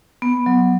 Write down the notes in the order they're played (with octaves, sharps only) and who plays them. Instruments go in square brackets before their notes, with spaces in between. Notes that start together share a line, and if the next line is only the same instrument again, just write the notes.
[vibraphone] B3
F#3